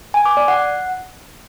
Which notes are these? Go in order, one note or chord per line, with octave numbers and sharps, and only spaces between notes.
G#5
D6
D5
F#5